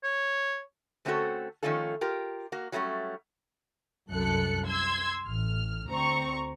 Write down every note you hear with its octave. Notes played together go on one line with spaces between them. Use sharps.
C#5
D3 A3 C4 C#4 F#4 A4
D#3 F3 A3 C#4 F4 A4
F4 G4 A#4
A#3 F#4
F#3 G3 A3 A#3 C#4
C2 F#2 A4 F#6 C#7
C6 E6 G#6
A1 F6
D2 C4 A#5 C#6